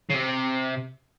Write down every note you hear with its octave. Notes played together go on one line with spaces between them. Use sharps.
C#3
C3